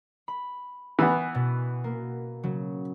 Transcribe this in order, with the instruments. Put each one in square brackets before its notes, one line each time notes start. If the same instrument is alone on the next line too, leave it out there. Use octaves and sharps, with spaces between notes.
[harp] B5
[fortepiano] E3 B3 [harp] B4 G#5
[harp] B2
A#3
C#3 F#3